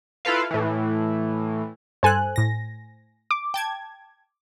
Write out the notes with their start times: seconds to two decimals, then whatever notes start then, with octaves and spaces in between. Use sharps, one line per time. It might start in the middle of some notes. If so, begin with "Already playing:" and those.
0.25 E4 F4 A4 B4 F5
0.51 A2 E3
2.03 G2 A4 C5 G#5 F#6
2.36 A2 A#6
3.31 D6
3.54 G5 A5 G#6